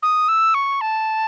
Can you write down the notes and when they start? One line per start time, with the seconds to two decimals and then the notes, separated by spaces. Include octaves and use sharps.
0.03 D#6
0.28 E6
0.54 C#6
0.81 A5